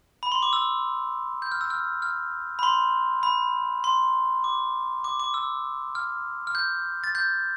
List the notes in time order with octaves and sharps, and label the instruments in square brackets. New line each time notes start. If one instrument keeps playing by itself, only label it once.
[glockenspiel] B5
C6
D6
E6
G6
F6
E6
F6
F6
B5
C6
B5
C6
D6
D6
D6
E6
F6
F6
G6
A6
G6